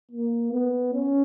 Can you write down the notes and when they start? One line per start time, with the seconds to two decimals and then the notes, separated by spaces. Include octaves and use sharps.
0.11 A#3
0.52 B3
0.93 C#4